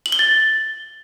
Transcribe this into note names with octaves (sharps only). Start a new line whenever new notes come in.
F#7
G7
A6